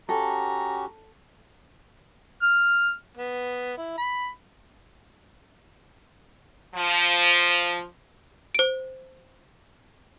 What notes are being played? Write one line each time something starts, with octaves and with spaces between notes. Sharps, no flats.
C#4 F#4 G4 A4 A#5
F6
B3
E4
B5
F3
C5 D7